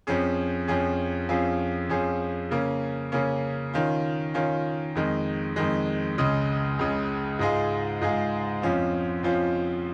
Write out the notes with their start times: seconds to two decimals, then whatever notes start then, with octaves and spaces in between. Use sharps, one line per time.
0.07 F2 F3 C#4 G#4
0.68 F2 F3 C#4 G#4
1.29 F2 F3 C#4 F4 G#4
1.89 F2 F3 C#4 F4 G#4
2.51 C#3 A#3 C#4
3.12 C#3 A#3 C#4
3.74 D#3 C#4 F4
4.34 D#3 C#4 F4
4.95 F2 D#3 G#3
5.56 F2 D#3 G#3
6.18 C#2 C#3 G#3
6.79 C#2 C#3 G#3
7.39 G#2 G#3 F4 G#4
8.01 G#2 G#3 F4 G#4
8.62 F2 F3 C#4 F4
9.23 F2 F3 C#4 F4